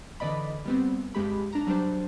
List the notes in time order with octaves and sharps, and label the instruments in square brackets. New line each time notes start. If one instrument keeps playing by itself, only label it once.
[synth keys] D3 E3 D5 D#5 B5
G3 B3 C4
G2 G#3 G4 B5
D4 A#5
F#3 G3 D4 C5